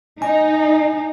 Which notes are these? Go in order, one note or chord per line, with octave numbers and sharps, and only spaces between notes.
D#4 G#5